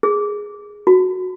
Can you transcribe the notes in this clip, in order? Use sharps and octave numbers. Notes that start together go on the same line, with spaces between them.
G#4
F#4